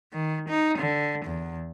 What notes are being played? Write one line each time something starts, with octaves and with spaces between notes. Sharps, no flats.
D#3
D#4
D3
E2